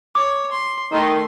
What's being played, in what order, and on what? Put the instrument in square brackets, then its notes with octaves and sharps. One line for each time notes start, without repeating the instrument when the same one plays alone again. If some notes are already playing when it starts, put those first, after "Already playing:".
[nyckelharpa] C#5 [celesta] D6
[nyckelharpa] C6
[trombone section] D#3 D#4 [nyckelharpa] A3 C6